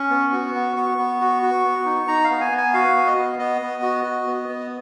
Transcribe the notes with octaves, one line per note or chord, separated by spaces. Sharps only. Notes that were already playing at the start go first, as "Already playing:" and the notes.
Already playing: C#4 C#6
B3
F#4
B3
B3 C#6
B3
F#4
F#4
B3
D#4
D#4 A#5
F5
B3
G#5
B3
G#5
F#4 F5
B3
D#5
B3
B3 D#5
B3
F#4
F#4
B3
B3